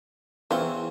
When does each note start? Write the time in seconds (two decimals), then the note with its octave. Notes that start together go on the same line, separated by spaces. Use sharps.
0.51 E2 E3 C4 F4 C#6